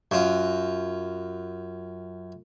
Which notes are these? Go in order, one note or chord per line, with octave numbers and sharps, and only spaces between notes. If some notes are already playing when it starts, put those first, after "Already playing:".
F#2 F4